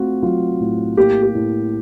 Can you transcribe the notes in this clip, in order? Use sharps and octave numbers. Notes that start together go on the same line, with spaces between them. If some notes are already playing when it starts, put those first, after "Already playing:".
Already playing: A3 C4 F4 F#4
F#3 F4
A2
A#3 G4
G4
A2